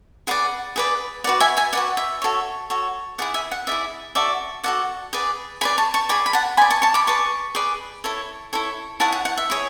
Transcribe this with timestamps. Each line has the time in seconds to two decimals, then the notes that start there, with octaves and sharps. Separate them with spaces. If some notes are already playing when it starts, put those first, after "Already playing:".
0.27 G#4 B4 D5 F#5
0.76 G#4 B4 D5
1.24 F#4 B4 D5 F#5
1.40 E5 G#5
1.57 E5 G#5
1.73 F#4 B4 D5 F#5
1.97 E5
2.22 F#4 A4 C#5
2.70 F#4 A4 C#5
3.18 E4 G#4 D5 F#5
3.34 E5 G#5
3.51 F#5
3.67 E4 G#4 D5 E5
4.15 F#4 A4 D5 E5
4.64 F#4 A4 D5 F#5
5.13 G#4 B4 D5
5.61 G#4 B4 D5 G#5 B5
5.78 A5 C#6
5.94 A5 C#6
6.09 G#4 D5 G#5 B5
6.26 B5
6.33 F#5 A5
6.57 G#4 D5 G#5 B5
6.70 A5 C#6
6.82 A5 C#6
6.94 B5 D6
7.07 G#4 B4 D5 A5 C#6
7.55 G#4 B4 D5
8.04 E4 A4 C#5
8.53 E4 A4 C#5
9.00 E4 G#4 C#5 F#5 A5
9.12 F#5
9.25 F#5
9.38 E5
9.50 E4 G#4 C#5